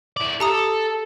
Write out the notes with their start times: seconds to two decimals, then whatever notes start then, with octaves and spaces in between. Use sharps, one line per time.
0.17 E4 D5
0.40 G4 A4 A#5 D#6